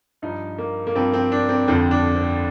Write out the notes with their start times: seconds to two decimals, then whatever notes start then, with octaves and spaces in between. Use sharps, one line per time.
0.22 G2 F3 D#4
0.58 A#3
0.87 A#3
0.95 G2 F3 C4
1.13 C4
1.32 D4
1.49 C4
1.68 F2 D3 F3 C4
1.91 D4
2.16 C4